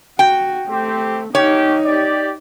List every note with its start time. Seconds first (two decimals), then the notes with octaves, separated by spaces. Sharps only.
0.19 F#4 G5
0.69 A3 C4 G4
1.35 A#3 C#4 D#4 G4 C#5
1.85 G4 D5